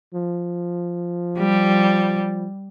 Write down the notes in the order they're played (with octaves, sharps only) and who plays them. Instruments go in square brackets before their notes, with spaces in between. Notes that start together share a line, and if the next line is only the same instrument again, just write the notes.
[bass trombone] F3
[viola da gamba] G3